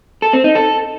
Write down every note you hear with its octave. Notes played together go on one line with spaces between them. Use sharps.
A4
C4
D#4
A4